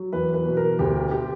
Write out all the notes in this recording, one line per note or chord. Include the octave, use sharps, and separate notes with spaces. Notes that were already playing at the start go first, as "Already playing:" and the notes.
Already playing: F#3
E2 B4
B4
B2
A#4
D2 G4
G4